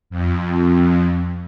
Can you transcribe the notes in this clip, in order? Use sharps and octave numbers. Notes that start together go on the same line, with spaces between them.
F2